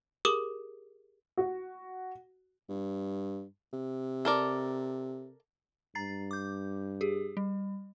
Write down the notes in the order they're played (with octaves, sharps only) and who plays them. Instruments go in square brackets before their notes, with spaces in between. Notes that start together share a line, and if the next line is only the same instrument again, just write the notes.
[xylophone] G4 G#4 A#4 D6 D#6
[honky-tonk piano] F#4
[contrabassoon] G2
C3
[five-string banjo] A4 A#4 D5
[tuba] G2 [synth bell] A#5 A6 C7
[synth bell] D6 G6
G4 G#4
G3